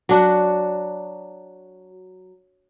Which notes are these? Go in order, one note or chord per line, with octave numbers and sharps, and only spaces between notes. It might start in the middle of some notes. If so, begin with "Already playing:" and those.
F#3 D4 F#4